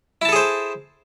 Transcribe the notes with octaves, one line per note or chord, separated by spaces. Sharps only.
E4 G#4 A4 C5 A5